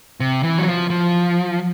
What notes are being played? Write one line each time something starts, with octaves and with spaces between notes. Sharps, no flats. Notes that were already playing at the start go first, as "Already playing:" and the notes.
C3
E3
F#3
F3
F3